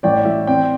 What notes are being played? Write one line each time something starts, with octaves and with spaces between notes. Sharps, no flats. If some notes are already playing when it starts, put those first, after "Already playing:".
A1 D5 G5
A1 E5
C4 D5 G5